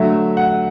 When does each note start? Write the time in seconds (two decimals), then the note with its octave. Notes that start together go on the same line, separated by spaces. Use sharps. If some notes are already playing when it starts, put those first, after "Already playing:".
Already playing: D3 F#3 A3 E5
0.37 F#5